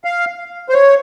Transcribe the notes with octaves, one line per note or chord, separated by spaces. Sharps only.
F5
C5
C#5